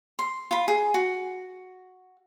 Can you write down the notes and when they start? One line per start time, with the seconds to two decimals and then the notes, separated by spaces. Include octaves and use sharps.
0.19 C6
0.51 F4 B5
0.68 G#4
0.94 F#4